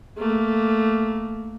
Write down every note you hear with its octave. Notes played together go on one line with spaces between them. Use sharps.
A3 A#3